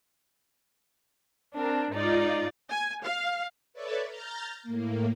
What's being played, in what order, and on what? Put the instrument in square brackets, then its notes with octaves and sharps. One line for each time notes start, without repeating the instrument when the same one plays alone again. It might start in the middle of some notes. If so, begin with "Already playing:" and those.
[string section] C4 D4 A#4
[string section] G#2 D#4 D5 [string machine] F4
[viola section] G#5
F5
[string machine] A4 B4 C#5 D5 E5 A5
A#5 F6 G6 A6
A2 A#3